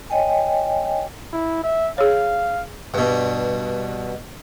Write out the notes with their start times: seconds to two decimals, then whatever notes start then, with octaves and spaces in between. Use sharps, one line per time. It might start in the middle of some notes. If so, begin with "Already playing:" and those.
0.10 C#5 D#5 G5 G#5
1.33 E4
1.64 E5
1.98 G#4 C#5 F5
2.94 G2 B2